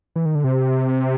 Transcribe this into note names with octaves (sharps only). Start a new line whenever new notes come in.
E3
D#3
D3
C3